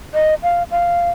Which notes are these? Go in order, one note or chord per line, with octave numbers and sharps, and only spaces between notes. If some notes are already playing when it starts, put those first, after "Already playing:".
D#5
F5
F5